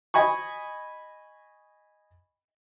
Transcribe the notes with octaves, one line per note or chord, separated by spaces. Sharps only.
D#5 G#5 B5 C#6